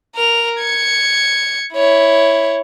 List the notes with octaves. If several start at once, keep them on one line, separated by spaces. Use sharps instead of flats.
A#4 F7
G#6 C#7
E4 C#5